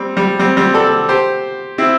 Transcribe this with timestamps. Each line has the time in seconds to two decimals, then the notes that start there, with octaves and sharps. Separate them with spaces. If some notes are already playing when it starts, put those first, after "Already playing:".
Already playing: G3 C4
0.17 G3
0.39 G3 C4
0.57 G3 C4
0.74 A4 D5
1.09 G4 C5
1.78 C4 E4